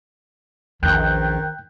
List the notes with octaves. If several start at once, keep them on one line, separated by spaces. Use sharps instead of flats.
A#1 E2 D#3 C#4 G5 F#6 G6